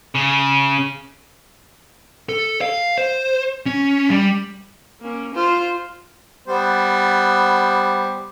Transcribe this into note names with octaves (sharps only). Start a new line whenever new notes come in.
C#3
A4
F5
C5
C#4
G3
A#3 C#4
F4 C5
G3 B3 C5